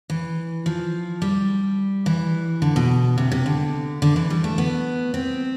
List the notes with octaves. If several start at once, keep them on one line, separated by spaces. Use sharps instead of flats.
E3
F3
G3
E3
D3
B2
C3
C3
D3
D3
E3
G3
A3
B3
C4